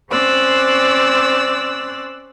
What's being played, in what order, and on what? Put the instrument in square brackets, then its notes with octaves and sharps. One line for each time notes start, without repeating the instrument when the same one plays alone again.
[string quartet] C4 C#4 C5 D5 E6 F#6